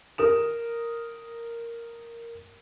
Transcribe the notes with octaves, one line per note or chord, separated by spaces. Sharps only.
A#4 D#6 E7